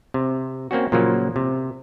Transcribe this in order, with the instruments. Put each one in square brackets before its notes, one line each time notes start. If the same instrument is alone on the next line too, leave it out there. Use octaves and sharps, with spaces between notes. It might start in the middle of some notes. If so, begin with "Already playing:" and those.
[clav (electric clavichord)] C3
A#3 C4 C#4 F#4
A#2 C#3 F3 F#3 A#3
C3